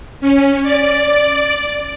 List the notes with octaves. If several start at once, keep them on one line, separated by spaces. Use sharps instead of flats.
C#4
D5